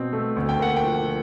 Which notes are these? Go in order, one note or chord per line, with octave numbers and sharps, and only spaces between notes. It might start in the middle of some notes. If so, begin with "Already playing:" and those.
Already playing: B2 C4
A3
D2
G5
A#3 F#5
G5
F3